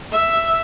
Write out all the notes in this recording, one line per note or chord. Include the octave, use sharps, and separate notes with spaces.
E5